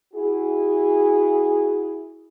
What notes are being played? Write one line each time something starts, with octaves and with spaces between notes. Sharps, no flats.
E4 F#4 G#4